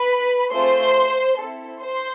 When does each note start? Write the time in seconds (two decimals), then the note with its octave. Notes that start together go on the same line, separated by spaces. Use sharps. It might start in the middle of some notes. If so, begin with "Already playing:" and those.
Already playing: B4 B5
0.53 A3 C4 F4 G#4 C5 C6
1.39 C4 E4 A4
1.81 C5 C6